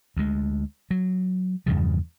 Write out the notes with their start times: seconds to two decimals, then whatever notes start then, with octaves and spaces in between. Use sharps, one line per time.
0.17 D2 G#3
0.91 F#3
1.66 E2 G2 C#3 F3